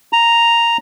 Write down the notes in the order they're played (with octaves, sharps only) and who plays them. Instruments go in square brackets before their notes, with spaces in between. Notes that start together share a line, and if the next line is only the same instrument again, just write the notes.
[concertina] A#5